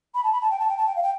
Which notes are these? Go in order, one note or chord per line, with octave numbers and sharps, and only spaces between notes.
B5
A5
B5
A5
G5
A5
G5
A5
G5
F5
G5